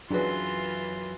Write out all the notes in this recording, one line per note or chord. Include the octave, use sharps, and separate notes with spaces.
F#2 E3 F#3 D4 F4 G#4 B4 C6